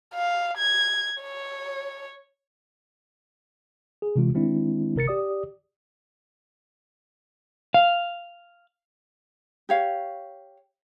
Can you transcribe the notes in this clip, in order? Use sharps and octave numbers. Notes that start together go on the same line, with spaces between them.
F5
G#6
C#5
G#4
C3 E3 G#3 F4
D#3 G#3 C4 D4 E4
G1 C3 A#4 A6 C#7
G4 D5 D#6
F5
G4 C#5 F5